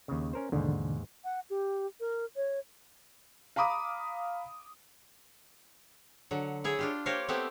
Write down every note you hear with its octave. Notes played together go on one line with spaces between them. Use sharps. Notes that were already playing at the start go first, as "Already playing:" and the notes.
D#2 C#3
C#4 A#4 C5
D#2 G#2 B2 D3 E3
F#5
G4
A#4
C#5
F5 A#5 B5 D6 D#6
D3 F#3
E4 G#4 C#5
D4 F4 G4
A#3 G4 A#4 C5 C#5 F5
A3 B3 C4 E4 G4